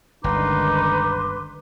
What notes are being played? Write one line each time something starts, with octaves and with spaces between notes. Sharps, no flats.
G1 C#2 D3 D#3 D#4 B4 C6 D6